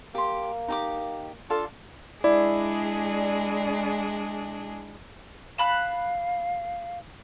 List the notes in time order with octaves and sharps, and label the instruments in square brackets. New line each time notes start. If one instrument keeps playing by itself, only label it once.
[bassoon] A#3 [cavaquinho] G4 C6
[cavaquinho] D#4 G4 D6
[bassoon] D4 [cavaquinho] F4 A4 F5
[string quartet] G#3 D4 G#4 [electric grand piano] E4 [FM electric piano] D5
[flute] F5 [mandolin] A5 B5 F#6